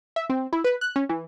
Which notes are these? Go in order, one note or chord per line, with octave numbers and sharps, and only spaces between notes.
E5
C4
E4
B4
F#6
C#4
E3